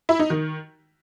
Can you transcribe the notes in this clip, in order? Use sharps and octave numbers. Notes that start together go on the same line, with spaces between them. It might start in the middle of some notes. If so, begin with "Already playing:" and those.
E4
D#4
D#3